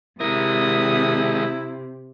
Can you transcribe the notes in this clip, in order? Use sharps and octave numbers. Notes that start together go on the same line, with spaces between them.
C3 G#3 E4 A#4 D#6